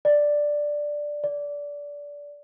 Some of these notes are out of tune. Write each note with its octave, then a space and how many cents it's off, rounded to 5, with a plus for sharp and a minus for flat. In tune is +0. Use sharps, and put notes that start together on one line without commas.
D5 +5
D5 -20